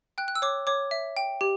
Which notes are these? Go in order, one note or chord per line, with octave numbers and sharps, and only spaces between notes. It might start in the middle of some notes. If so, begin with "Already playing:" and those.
G5 F#6
F#6
E6
C#5 D6
C#5 D6
E5
G5
G4